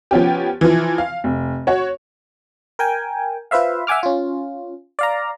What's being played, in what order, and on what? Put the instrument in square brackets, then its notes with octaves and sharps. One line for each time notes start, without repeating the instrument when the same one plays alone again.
[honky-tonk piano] F3 B3 C#4 G4
E3 F3
F5
F1
F#4 C#5
[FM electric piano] A#4 G5 G#5
F4 B4 C5 E5 F5
E5 F#5 G#5 D6 F6
C#4 F4
D5 F5 A#5